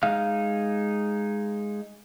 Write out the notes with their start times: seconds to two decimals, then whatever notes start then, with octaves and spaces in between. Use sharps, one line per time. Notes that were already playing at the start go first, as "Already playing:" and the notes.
0.03 G#3 D#4 F5 F6